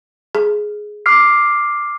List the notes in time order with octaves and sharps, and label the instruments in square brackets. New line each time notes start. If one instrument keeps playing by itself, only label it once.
[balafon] G#4
[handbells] D6 F6 C7